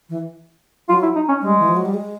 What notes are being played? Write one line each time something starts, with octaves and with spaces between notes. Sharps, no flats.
E3
F#3 F4
E4
D#4
C#4
G3 G#3
E3
F3
F#3
G3
G#3